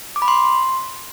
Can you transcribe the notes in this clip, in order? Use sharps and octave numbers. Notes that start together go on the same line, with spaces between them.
D6
B5
C6